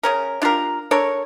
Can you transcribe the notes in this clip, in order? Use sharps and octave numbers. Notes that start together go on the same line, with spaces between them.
C#3 C#4 A#4
D4 F4 G4 A#4
D4 A4 A#4 C#5